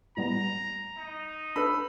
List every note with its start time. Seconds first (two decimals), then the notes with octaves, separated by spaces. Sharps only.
0.17 A2 G3 B3 A#5
0.97 D#4
1.56 D4 A4 B4 B5 E6